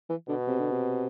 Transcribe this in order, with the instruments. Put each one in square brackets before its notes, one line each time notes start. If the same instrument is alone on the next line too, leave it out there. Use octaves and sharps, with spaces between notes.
[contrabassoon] E3
[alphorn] B2 [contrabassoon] D3
[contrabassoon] C3
D3
C3